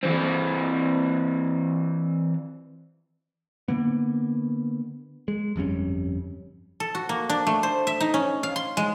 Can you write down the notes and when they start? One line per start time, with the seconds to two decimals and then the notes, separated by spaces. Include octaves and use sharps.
0.03 E3 C4
3.68 D3 A#3 B3
5.28 G#3
5.56 G1 F2 G3 C#4
6.80 A4
6.95 F#4
7.09 A#3
7.29 D4
7.47 A3
7.63 C5
7.87 E5
8.00 D#4
8.14 C#4
8.43 F5
8.56 C6
8.77 G#3